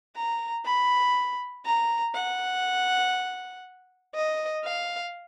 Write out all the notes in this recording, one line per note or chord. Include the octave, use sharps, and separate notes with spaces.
A#5
B5
A#5
F#5
D#5
F5